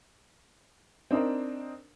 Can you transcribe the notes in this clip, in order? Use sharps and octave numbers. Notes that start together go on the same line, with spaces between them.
C4 D4 D#4 A#4 C5